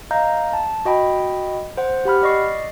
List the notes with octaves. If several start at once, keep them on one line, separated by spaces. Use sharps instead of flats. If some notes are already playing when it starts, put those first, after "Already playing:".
D#5 F5 A#5 G6
A5
F#4 D#5 G5 B5
C5 F#5
G4 F#5 B5 F6
D5 D#5 C#6 C7